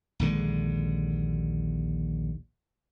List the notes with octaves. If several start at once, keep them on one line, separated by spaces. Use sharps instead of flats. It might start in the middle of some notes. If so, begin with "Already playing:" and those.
A#1 D#2 D3 G#3